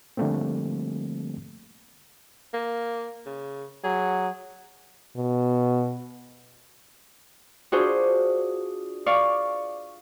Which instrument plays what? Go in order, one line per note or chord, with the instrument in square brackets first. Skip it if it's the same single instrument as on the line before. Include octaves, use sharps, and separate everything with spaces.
[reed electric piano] D3 F3 G3 A3 A#3 C4
[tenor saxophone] A#3
C#3
[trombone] F#3 [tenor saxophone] G#4
[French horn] B2
[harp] D4 F4 F#4 G#4 C5
D5 F5 C#6